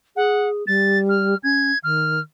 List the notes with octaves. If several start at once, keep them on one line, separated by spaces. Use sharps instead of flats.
G#4 F#5
G3 A6
F6
C#4 G#6
D#3 F6